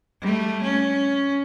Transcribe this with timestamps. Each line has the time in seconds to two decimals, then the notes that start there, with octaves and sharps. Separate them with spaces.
0.21 G3 A3
0.62 C#4